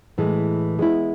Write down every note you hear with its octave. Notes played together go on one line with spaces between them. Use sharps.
A2 E3 G#3
G#3 B3 E4